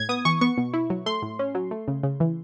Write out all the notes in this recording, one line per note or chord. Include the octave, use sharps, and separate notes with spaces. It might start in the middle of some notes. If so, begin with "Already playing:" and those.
Already playing: A2 G#6
B3 D#6
E3 C#6
B3 C#6
B2
E4
F#3
A3 C6
A2
C#4
F#3
A3
C#3
C#3
E3